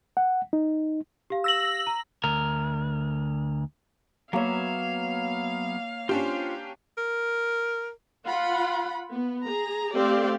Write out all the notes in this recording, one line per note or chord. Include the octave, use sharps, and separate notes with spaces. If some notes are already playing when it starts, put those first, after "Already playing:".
F#5
D#4
G4 F5
E6 A#6 F#7
A#5
D2 A#4
F#3 A#3 B3 C#5 E5 F5
C#4 D4 F4 G4 C5
A#4
F4 F#5 B5
B3
G#4 A#5
A3 C4 G4 D5 F5